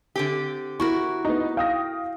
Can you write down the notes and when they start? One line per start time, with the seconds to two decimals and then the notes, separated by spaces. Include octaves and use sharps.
0.16 D3 C4 G4
0.80 E4 F#4 A#4 C#6
1.25 B3 D#4
1.57 F5 G5 D#6 A#6